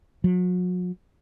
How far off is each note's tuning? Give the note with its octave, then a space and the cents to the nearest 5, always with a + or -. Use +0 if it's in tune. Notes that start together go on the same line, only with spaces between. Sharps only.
F#3 -40